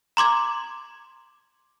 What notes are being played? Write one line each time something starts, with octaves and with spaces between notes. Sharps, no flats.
A#5 C6 D6 G#6